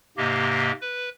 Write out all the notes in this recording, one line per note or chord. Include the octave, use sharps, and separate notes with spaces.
G#2 C3 A#3 G4 D#5
B4